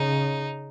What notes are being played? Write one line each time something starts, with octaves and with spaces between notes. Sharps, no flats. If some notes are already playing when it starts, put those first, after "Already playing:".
Already playing: C#3 D#4